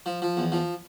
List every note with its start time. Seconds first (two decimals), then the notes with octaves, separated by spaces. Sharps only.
0.06 F3
0.22 F3
0.37 E2
0.52 F3